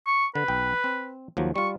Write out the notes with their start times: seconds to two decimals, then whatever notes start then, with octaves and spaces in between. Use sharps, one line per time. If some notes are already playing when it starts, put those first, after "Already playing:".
0.07 C#6
0.35 D3 B4
0.48 B1 G5
0.84 C4
1.37 D#2 F3 F#3
1.56 G3 F4 C#6